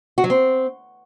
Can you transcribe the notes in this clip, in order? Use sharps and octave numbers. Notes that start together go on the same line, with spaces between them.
F#4
F#3
C4